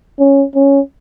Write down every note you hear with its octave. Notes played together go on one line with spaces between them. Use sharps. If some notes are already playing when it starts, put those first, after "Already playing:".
C#4
C#4